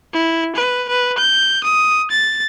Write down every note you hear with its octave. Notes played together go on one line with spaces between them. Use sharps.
E4
B4
B4
G6
D#6
A6